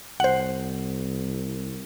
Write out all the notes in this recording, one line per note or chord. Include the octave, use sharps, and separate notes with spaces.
C2 C5 F#5